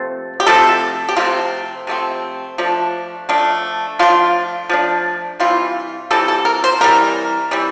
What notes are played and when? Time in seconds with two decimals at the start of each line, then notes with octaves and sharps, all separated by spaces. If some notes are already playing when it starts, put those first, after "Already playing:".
Already playing: C3 F3 A3 C4
0.40 G4
0.47 C3 F3 A3 C4 A4
1.09 G4
1.17 C3 F3 A3 C4 F4
1.87 C3 F3 A3 C4
2.58 F3 A3 D4
3.29 F3 A3 D4
3.99 F3 A3 D4 F4
4.69 F3 A3 D4
5.40 C3 E3 G3 F4
6.11 C3 E3 G3 A4
6.28 A4
6.45 A#4
6.64 C5
6.81 C3 E3 G3 A#4
7.51 C3 E3 G3